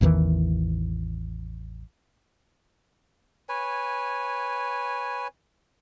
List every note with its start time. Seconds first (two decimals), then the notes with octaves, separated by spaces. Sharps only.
0.01 A1 E2 D#3 E3
3.49 B4 C#5 G#5